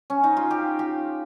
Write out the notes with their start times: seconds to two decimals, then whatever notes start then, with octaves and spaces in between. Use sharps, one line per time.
0.10 C#4
0.24 D#4
0.37 F4
0.51 G4
0.79 G4